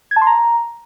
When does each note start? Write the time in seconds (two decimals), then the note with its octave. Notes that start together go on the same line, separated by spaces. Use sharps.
0.11 G#6
0.16 A5
0.22 C6
0.27 A#5